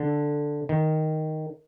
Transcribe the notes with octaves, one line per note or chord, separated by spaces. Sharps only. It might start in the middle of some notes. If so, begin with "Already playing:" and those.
Already playing: D3
D#3